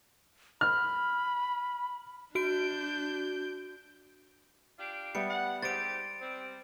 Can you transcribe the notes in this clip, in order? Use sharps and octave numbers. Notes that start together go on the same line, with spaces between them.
B5 F6
D4 F#4 G6 D7
D4 F4 G4
G3 B3 E5 C#7
F#5
G#2 G4 C5 A6 D7
G3 C4